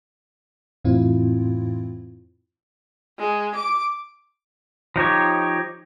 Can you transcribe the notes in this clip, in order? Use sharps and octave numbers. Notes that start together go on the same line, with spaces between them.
F2 A2 E3 C4 E4 F4
G#3
D6
F3 D#4 G4 C#5